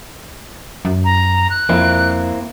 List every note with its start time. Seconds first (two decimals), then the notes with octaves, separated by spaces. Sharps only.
0.85 F#2
1.04 A#5
1.50 F#6
1.69 F2 A#3 C4 E4